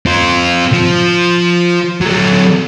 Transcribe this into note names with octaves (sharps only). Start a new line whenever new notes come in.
C4 F4
F3
F#3 A3